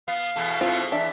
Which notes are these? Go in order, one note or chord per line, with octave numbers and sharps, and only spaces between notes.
B3 F5
E2 B2 A3
G#2 B2 A3 C4 E4 F4
E2 D4 E5